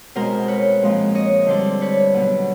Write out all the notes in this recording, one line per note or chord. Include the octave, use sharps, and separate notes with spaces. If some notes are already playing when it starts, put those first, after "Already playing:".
B2 G#3 C4 A#4 C5
B4 C#5
A#2 F3 G#3 C4
C#5 D#5
D3 G3 C4 C5 D5
B4 C#5
B2 F#3 B3